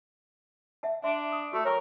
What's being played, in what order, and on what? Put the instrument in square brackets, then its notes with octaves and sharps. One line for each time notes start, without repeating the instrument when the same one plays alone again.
[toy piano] E5 F#5 A5
[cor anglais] D4 [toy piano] E5 C6
[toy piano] D#6
[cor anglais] A3 [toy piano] F#4
[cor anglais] A#4 [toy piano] C#5 G5 C#6